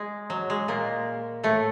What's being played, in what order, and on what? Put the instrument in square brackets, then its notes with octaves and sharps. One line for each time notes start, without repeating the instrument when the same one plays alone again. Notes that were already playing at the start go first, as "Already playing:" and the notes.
Already playing: [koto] G#3
F#3
G#3
A#2 A#3
A2 A3